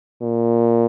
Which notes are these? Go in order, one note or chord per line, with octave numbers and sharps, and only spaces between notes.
A#2